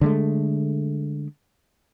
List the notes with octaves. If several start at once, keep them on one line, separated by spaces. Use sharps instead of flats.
D3 G#3 A3